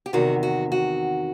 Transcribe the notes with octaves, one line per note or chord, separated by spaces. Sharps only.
G4
E2 C3 D#3 F#4
F#4
F#4